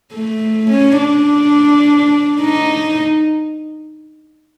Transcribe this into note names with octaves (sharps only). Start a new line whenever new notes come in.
A3
C#4
D4
D#4